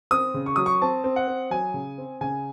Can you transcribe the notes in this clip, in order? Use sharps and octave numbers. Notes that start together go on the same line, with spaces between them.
C4 D#6
C#3
C#6
F#3 D#6
C#6
C4 A5
C4
F#5
C4
F#3 G#5
C#3
C4
C#3 G#5